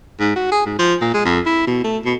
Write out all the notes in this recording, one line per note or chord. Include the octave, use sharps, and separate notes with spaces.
G#2
F#4
G#4
G#2
F3
A#2
G#3
F2
E4
B2
A3
B2